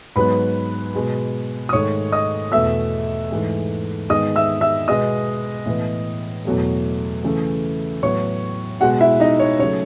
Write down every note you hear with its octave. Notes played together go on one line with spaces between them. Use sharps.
G#2 F#3 B3 B4 B5
B2 G#3 B3
D#6
G#2 D#3 A3 C#5 C#6
D#5 D#6
E2 B2 A3 E5 E6
G#2 E3 A3
G#2 D#3 G#3 B3 D#5 D#6
E5 E6
E5 E6
B2 G#3 B3 D#5 D#6
A2 E3 B3
E2 B2 F#3 A3
C#3 E3 A3
A2 F#3 B3 C#5 C#6
B2 G#3 B3 F#4 F#5
E4 E5
D#4 D#5
C#5
C#3 F#3 A3 C#5